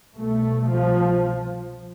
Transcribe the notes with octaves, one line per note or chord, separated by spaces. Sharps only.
C2 B2 A3
F3